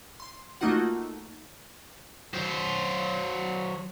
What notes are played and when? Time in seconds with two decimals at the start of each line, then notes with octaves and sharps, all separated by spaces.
0.20 C6
0.61 A3 A#3 D#4 F4 F#4 F#5
2.34 F#3 C5